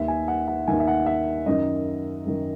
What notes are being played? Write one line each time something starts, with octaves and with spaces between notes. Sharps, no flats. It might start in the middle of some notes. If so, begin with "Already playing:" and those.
Already playing: D#2 D#3 E5
G#5
F#5
F#5
D#2 D#3 G#5
E5
F#5
E5
F#2 D#3 D#5
F#2 D#3